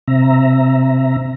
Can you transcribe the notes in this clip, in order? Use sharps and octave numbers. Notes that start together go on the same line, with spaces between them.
C3 C4 E5 A#5